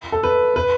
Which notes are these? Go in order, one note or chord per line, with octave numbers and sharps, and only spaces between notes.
A4
B4
B4